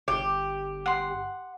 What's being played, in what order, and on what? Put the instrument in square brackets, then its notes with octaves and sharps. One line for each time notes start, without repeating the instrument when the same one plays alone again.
[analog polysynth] G1 [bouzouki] G4
[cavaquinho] F#5 C6